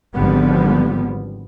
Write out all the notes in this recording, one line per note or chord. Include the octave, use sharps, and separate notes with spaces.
G#1 D3 F3 G3 B3